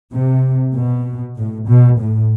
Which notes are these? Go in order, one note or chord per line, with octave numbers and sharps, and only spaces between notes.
C3
B2
A2
B2
A2